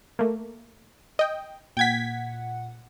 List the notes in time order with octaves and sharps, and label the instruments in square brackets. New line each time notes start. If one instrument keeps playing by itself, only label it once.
[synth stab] A3 A#3
D#5 G5
[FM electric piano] A#2 F#5 [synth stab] G5 G#6 B6